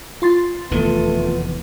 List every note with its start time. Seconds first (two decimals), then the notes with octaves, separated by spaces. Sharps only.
0.22 F4 C6 A6
0.71 F1 E2 D#3 A3 B3